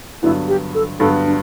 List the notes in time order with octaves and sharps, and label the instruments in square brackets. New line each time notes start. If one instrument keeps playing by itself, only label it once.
[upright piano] G2 D3 F#3 B3 [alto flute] E4
[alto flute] G4
A4
[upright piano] G2 D3 F#3 B3 [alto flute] A4
[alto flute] D4